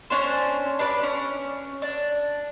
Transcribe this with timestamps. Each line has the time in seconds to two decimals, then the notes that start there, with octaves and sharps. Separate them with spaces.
0.10 C#4 D4 C5
0.79 D4 B4 D5
1.03 C#4
1.82 D4